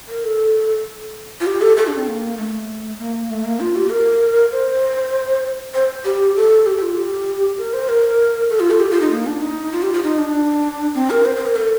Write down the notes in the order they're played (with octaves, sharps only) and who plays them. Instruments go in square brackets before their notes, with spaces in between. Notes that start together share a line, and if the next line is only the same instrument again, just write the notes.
[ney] A#4
A4
F4
G4
A4
A4
D4
C4
A#3
A3
A#3
A3
A#3
F4
G4
A#4
C5
C5
G4
A4
G4
G4
F4
G4
A#4
C5
A#4
A4
F4
A4
G4
F4
D#4
A#3
D4
D#4
F4
G4
F4
D#4
D4
C4
A#4
C5
C5
A#4
A4